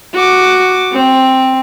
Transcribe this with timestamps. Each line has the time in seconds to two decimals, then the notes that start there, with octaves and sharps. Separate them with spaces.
0.14 F#4 D6
0.93 C4